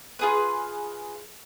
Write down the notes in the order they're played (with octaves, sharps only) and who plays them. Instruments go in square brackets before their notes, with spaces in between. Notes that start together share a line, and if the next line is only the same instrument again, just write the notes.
[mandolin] F4 G#4 B4